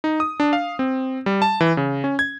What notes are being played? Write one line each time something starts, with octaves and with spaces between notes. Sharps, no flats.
D#4
D#6
D4
F5
C4
G3
A5
E3
C#3
C#4
G#6